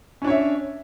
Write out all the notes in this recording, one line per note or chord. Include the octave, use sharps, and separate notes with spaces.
C#4 D4 C#5 E5